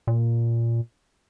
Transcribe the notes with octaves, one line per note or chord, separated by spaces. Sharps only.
A#2